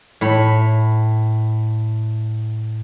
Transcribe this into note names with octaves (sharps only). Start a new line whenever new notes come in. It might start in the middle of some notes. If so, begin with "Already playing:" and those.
A2 B5